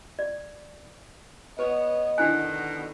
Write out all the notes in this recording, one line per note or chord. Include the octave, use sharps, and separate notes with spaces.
D5
B3 B4 C#5 D#5
B2 D3 D#3 D4 E4 G#5 F#6